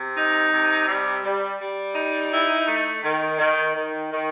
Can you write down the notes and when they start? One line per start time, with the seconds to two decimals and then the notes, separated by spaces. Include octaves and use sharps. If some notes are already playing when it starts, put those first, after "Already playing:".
Already playing: C3
0.16 D#4
0.51 C3
0.87 G3
1.23 G3
1.60 G3
1.95 D#4
2.31 E4
2.68 A3
3.03 D#3
3.39 D#3
3.75 D#3
4.11 D#3